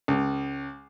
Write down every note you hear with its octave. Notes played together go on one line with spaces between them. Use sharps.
C#2